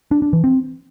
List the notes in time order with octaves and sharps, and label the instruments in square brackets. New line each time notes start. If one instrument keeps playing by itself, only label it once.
[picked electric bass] D4
D4
E3
C4